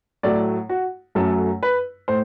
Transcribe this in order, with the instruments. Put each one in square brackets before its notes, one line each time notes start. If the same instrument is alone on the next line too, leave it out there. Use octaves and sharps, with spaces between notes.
[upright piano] A2 F#3 A3 D5
F#4
F#2 F#3 A3 A4
B4
A2 C5